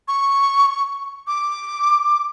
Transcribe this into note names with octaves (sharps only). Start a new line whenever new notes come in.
C#6
D6